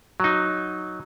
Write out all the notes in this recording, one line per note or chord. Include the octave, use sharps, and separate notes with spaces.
F#3 D#4